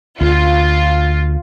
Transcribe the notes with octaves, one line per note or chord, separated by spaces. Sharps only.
D2 F4